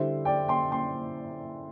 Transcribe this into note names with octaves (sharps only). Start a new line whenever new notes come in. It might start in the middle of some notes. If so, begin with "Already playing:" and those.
Already playing: D3 G3 E4 C5
D5 G5
G5 C6
G5 C6